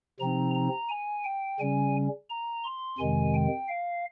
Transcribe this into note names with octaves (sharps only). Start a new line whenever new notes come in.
C3 F3 C4 D#4 A#5
A#5
G#5
G5
C#3 G3 C#4 G#5
A#5
C6
F2 C3 D#3 G#3 G#5
G5
F5